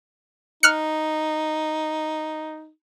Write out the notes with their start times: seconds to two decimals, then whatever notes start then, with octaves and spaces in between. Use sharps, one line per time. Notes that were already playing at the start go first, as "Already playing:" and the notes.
0.63 D#4 F6 F#6 C#7